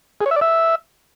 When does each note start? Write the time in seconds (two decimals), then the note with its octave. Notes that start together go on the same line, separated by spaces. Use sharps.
0.21 G#4
0.26 C#5
0.31 E5
0.36 D5
0.41 E5